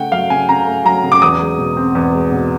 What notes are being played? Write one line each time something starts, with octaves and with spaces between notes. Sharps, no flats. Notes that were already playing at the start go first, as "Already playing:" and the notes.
Already playing: C#3 A3 F#5 G5
F#3 F5
C#3 G#5
C#3 A#5
A3
F#3 A#5
C#3
D6
E2 D#6
G#3
B2
C4
E2
G#3
B2